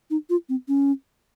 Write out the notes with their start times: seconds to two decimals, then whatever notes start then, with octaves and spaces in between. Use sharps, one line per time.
0.10 D#4
0.30 F4
0.49 C4
0.68 C#4